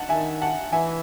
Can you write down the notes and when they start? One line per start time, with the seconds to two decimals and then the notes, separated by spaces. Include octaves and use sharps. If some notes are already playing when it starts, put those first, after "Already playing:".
Already playing: F#5 A5
0.09 D#3 E5 G#5
0.42 F#5 A5
0.72 E3 E5 G#5